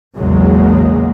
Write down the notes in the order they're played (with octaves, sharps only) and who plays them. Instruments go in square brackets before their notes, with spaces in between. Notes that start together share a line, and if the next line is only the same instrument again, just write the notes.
[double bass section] A#1 E2 C#3 F#3 G#3 A#3